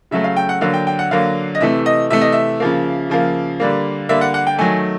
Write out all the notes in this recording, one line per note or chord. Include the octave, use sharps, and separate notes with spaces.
C#3 F#3 A3 E5
F5
G5
F#5
D3 F#3 A#3 F5
G5
G5
F#5
D3 F#3 A#3 F5
D#5
C3 E3 A3 E5
D#5
C3 E3 A3 E5
D#5
E5
C#3 F3 A#3
C#3 F3 A#3
D3 G3 A#3
D3 G3 A#3 E5
F#5
F#5
G5
D#3 F#3 A3 G#5